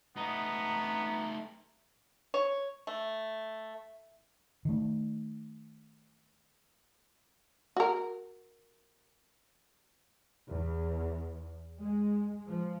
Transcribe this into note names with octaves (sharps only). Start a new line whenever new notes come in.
A3 B3 D#4 A#5
C#5
A3
D#3 A3
F#4 A#4
E2
G#3
F3